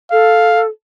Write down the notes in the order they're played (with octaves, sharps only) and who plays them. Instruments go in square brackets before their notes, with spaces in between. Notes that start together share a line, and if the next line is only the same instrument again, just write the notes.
[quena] A4 [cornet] F5